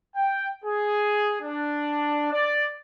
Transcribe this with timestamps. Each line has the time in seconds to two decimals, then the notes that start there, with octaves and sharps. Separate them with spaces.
0.16 G5
0.64 G#4
1.42 D4
2.32 D5